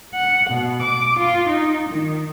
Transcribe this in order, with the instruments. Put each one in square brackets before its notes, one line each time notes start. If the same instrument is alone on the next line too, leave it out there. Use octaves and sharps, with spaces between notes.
[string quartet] F#5
B2
D6
F4
D#4
D#3